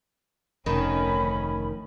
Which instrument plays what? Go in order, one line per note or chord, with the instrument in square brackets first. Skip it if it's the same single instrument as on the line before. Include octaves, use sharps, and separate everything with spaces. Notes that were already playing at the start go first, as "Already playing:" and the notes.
[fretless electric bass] F1 [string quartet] D2 C#4 [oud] D#3 [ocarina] B5